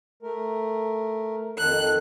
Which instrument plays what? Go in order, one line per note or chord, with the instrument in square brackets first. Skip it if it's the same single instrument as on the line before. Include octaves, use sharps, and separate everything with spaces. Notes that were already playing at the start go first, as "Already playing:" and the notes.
[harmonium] A3 A#4
[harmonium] F2 D#3 [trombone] A4 [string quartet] F#6